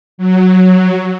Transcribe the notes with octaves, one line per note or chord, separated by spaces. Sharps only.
F#3